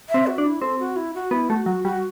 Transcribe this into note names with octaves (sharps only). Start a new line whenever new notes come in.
C4 E5
F#4
D4
E4
C4 A4
F#4
E4
F#4
B3 E4
A3 F#4
F#3 F#4
G3 F#4